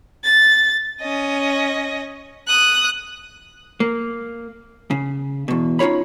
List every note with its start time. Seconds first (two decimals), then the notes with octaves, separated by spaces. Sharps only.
0.24 A6
1.01 C#4 D#5
2.47 D#6 F#6
3.80 A#3
4.91 C#3
5.48 E2 B2
5.79 C#4 D#4 F4 C#5 B5